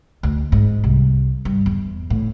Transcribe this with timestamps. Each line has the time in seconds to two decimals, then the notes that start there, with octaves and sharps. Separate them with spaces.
0.23 D2
0.52 G#2
0.84 C2
1.45 G2
1.66 E2
2.10 A2